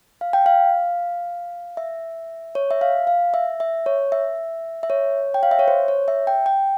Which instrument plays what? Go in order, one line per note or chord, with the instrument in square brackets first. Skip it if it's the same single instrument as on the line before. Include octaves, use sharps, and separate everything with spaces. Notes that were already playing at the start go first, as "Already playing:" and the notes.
[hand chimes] F5
G5
F5
E5
C#5
E5
F5
F5
E5
E5
C#5
E5
E5
C#5
G5
F5
E5
C#5
C5
C#5
E5
G5
G5